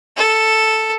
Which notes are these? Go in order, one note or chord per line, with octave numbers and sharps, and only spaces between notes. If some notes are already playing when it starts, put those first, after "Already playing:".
A4